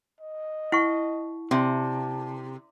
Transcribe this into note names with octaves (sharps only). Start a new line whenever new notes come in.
D#5
E4 F#5 C#6
C3 C#4 D5 E5 A5